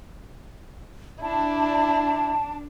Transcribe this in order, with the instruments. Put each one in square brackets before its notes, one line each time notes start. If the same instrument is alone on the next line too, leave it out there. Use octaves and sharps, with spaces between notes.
[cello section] D4 [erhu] E4 [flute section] A5